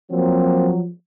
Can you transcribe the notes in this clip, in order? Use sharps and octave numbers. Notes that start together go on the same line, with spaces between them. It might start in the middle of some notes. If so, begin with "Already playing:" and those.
F3 F#3 A#3 C4